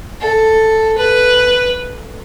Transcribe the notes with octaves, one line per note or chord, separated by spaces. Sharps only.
A4
B4